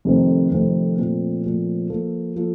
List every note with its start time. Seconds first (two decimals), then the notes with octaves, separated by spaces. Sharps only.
0.05 F2 C3 D#3 A3 C4
0.51 F2 C3 D#3 A3 C4
0.98 A#2 F3 A3 C4
1.44 A#2 F3 A3 C4
1.90 F3 A#3 F4 A4
2.36 F3 A#3 F4 A4